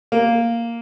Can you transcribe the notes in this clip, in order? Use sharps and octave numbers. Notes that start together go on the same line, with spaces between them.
A#3